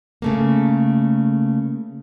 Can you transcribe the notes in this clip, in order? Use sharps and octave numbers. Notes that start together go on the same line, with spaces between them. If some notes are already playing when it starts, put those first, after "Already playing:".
C#3 A3 A#3